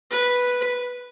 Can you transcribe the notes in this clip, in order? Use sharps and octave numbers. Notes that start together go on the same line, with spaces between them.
B4